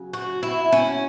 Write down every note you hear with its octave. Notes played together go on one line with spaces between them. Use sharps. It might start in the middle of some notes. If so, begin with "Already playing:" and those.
Already playing: C#3 F#3
F#4
E4
C#4